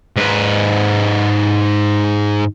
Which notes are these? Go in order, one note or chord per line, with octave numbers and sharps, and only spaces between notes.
G#2 B4